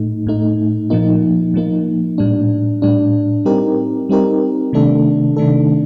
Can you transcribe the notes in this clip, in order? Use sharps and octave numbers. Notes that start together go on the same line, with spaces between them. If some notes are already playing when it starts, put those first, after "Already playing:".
Already playing: A2 A3 D#4
A2 A3 D#4
A#2 F3 A#3 D#4
A#2 F3 A#3 D#4
A2 G3 D4
A2 G3 D4
G3 C4 D#4 G4 A#4
G3 C4 D#4 G4 A#4
C3 D#3 A3 D4 A4
C3 D#3 A3 D4 A4